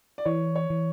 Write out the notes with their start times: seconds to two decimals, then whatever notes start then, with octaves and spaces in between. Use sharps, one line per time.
0.18 D5
0.25 E3 C#5
0.56 C#5
0.70 E3